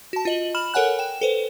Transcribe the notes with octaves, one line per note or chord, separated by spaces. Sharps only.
F#4 A5
F4 D#5 F#7
B5 F6 E7 F#7
A4 A#4 C#5 F#5 G#5 F#6
G5 E7
A4 B4 C5